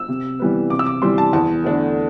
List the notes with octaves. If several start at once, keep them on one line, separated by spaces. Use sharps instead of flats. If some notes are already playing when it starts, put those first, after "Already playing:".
Already playing: E6
C3
E3 G3 B3
C3 D6
E6
D6
E3 G3 C6
A5
E2 A5
D3 A3 D4